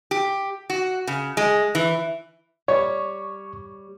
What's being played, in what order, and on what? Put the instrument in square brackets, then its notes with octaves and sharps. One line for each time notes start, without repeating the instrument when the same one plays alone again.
[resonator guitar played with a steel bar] G4
F#4
C#3
G#3
E3
[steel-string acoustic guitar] G3 [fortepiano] C#5 [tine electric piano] C#6